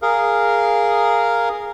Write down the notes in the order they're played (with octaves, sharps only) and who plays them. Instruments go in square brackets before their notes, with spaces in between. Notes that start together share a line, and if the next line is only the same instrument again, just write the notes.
[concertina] G#4 A#4 F5